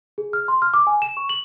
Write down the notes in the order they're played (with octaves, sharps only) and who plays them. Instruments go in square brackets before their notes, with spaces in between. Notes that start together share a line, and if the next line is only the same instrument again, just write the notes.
[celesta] G#4
F6
C6
F6
D6
G#5
E7
C#6
F#7